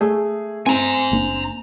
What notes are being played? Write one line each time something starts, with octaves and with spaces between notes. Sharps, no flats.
A3 G#4
C4 G#5 A#5
F#1 A#3 D4